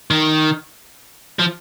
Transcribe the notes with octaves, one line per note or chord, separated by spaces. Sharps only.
D#3
F3